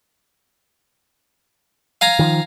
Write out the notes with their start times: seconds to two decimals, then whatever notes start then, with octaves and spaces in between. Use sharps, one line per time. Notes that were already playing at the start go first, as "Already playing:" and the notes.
2.01 F5 G#5 A#5
2.19 D#3 F3